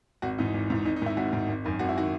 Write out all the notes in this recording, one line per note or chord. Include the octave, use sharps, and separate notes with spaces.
G#1 F#4
G#2 E3 D#4
G#1
G#2 E3
G#1 D#4
D#4
G#2 D#3 E4
G#1 F#4
G#2 D#3
G#1
F#2 D#3
G#1 F#4
E4
D#3 F#4